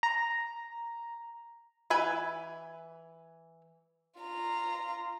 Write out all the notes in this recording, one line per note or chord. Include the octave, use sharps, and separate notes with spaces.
A#5
E3 B4 G#5
F4 A#5